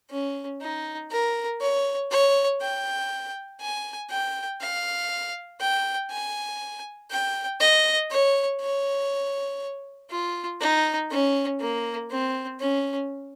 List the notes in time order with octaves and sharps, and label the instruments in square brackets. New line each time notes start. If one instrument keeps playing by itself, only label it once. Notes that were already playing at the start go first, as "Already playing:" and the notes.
[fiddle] C#4
D#4
A#4
C#5
C#5
G5
G#5
G5
F5
G5
G#5
G5
D#5
C#5
C#5
F4
D#4
C#4
A#3
C4
C#4